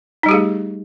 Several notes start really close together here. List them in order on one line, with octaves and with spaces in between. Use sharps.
D#4 G3 G4 G#4 A3